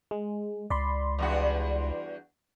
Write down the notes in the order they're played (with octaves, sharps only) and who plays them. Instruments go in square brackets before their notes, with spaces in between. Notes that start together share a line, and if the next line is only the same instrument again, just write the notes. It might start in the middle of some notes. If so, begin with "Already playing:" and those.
[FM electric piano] G#3
[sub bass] C#2 [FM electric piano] D5 B5 C6
[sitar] E2 G2 F#4